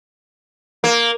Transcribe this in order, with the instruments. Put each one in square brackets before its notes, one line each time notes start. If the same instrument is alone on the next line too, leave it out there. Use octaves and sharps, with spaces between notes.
[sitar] A#3